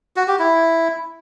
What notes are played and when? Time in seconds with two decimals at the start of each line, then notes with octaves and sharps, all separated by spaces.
0.16 F#4
0.28 G4
0.39 E4